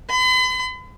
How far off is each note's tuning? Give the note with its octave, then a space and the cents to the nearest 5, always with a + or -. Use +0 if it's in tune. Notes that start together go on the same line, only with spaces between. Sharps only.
B5 +45